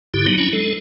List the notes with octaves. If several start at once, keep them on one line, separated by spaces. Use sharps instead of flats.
G#2 D3 E4 G4
F#3 G3 B3 D#4
F#3 C#4 D4 E4
G#3 A4